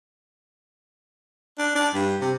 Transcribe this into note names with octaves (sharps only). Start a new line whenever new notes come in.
D4
D4
G2
C3